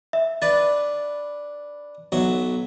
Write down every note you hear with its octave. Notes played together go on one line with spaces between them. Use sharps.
E5
D4 B4 A6
B1 F#3 E5